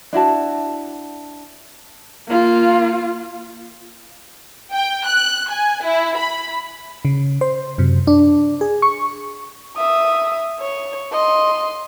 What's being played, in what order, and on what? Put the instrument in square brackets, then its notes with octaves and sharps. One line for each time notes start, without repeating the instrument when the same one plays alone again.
[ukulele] D4 E4 F#4 A5
[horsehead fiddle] A#3 F4
[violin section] G5
F#6
G#5
E4
B5
[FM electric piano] C#3
C5
F#2 C3
D4
G#4
C#6
[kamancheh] E5 D#6
C#5
D#5 C6